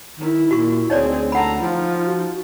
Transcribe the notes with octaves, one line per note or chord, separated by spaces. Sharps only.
D#3 E4
A#2 F#4 C#6
D2 C4 D#4 G#4 C#5 D5
A4 F#5 A#5 B5
F3 D#4 F4
F#4